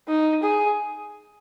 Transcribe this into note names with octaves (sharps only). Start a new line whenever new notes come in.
D#4
G#4